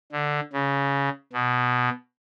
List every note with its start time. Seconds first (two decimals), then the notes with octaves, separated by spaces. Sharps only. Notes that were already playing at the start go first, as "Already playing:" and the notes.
0.12 D3
0.53 C#3
1.33 B2